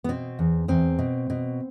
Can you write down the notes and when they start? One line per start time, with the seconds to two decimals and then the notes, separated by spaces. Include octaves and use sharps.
0.04 B3
0.09 B2 C4
0.39 E2
0.68 E2 C4
0.99 B2
1.30 B2